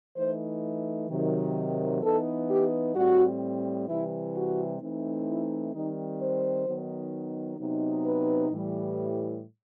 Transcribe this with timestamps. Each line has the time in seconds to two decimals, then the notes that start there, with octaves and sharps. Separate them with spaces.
0.16 E3 A3 D#4 C5
1.09 C3 D#3 F#3
2.01 E3 B3 D#4 A4
2.48 G4
2.95 A2 G3 C4 F#4
3.87 C3 E3 G3 E4
4.34 F#4
4.80 E3 A3 C4 D#4
5.26 E4
5.73 D#3 G3 C4 D#4
6.20 C5
6.66 D#3 F#3 B3 D#4
7.58 C3 F#3 B3 D#4
8.05 B4
8.51 A2 E3 G3